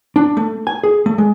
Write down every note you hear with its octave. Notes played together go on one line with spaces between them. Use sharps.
D4
A3
G#5
G#4
A3
G#3